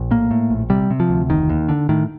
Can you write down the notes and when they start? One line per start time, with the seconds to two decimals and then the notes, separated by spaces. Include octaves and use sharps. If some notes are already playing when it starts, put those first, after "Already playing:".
Already playing: A#1
0.11 A2 A#3
0.31 A2
0.50 A#1
0.70 C3 G3
0.91 C3
1.00 F3
1.10 D2
1.29 F1 D#3
1.49 D#2
1.69 D3
1.89 A2 D#3